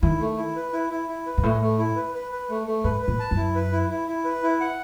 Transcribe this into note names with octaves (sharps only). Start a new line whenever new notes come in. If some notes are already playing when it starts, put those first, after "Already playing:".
D#3 E4
A3
E4
B4
E4
E4
E4
B4
G#2
A2 A3
A3
E4
B4
B4
B4
A3
A3
G#2 B4
B4
A2
A5
F#2
E4
B4
E4
E4
E4
B4
E4
F#5